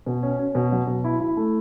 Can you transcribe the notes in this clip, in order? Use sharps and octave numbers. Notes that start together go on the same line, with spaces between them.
B2
C#4
C#4
B2
F#3
B2
E4
E4
A3